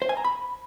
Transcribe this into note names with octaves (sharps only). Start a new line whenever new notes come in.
C5
G#5
A#5
B5